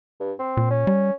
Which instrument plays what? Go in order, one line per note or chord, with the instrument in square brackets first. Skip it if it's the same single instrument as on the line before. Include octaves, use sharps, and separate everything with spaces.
[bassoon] G2
C4
[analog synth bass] A#2
[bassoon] C#4
[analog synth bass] G3